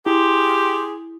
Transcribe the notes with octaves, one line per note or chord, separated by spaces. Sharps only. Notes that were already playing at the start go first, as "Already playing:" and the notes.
E4 G4 G#4 C6